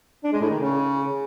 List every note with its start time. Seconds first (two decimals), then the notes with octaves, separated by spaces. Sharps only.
0.24 D4
0.33 G#3
0.41 A2
0.50 D#3
0.59 C#3